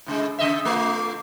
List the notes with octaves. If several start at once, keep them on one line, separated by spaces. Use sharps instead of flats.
A2 C#3 G#3
C#3 D#5 E5
A3 F4